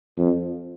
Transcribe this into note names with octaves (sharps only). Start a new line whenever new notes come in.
F2